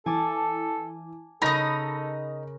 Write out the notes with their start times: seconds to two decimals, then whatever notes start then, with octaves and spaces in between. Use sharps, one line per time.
0.06 E3 A4 G#5 A5 D6
1.42 C#3 D#4 A4 A#4 D#5 B5 C#6 A#6